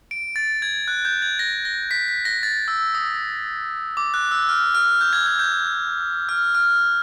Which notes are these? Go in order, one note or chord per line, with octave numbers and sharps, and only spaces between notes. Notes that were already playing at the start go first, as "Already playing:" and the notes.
D7
A6
G#6
F#6
G6
G#6
A#6
A#6
B6
B6
A#6
A6
E6
D#6
D6
F#6
E6
F6
F6
G6
G#6
G#6
G6
F6
F6